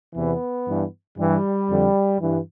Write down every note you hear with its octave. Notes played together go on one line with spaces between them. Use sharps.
E2 C3 E3 B3
G2 E3
G2 E3 G3
F2 D3
G2 E3